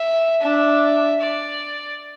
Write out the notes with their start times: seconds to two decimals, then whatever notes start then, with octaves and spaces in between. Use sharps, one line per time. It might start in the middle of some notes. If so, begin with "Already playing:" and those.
Already playing: E5
0.42 D4 E5
1.21 D5